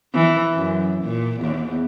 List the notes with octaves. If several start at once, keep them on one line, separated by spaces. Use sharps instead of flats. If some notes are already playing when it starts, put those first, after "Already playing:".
E3
F#2
A#2
E2